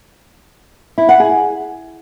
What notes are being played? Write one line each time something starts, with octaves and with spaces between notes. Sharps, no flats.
E4
F#5
G#4